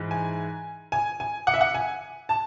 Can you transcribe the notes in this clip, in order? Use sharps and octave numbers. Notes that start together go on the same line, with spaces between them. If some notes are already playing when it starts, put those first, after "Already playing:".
Already playing: G#2 E3
G#5
G#5
G#5
F#5
E5
F#5
G#5
A5